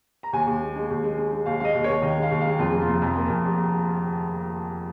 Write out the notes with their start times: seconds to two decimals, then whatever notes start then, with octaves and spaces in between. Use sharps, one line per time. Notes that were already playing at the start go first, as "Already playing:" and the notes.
0.23 A#5
0.33 D#2 G#5
0.47 D#2
0.61 G#3
0.76 G#3
0.90 D#2
1.04 G#3
1.18 G#3
1.33 G#3
1.46 D#2 F5
1.60 G#3 D#5 F5
1.75 D#2
1.84 C#5
1.89 D#2
2.02 D#3 D#5
2.18 G#3 F5
2.31 D#2
2.41 F5
2.46 G#3
2.59 F2 F4
2.70 F1 G#4
2.82 F4
2.88 F1
3.02 F2
3.16 A#3
3.30 F2
3.45 F1